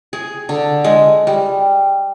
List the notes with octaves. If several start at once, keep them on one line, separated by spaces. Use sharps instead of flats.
G#4
D3
G#3
G3